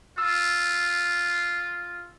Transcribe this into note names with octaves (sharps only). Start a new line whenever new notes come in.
F4 E6